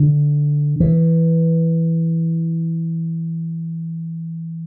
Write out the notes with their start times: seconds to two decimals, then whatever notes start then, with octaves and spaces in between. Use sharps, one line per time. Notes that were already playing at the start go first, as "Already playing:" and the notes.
Already playing: D3
0.80 E3